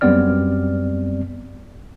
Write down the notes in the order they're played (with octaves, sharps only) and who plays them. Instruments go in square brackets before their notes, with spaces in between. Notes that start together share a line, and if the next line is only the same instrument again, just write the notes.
[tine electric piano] F#2 G3 B3 C4 D5 F6